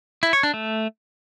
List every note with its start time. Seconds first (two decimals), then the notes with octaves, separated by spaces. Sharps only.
0.23 E4
0.33 C#5
0.43 D4
0.54 A3